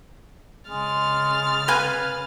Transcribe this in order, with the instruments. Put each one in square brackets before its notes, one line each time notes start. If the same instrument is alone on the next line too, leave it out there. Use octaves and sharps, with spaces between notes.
[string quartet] C#3 F6 A6 [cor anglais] G#3
[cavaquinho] B4 F5 G#5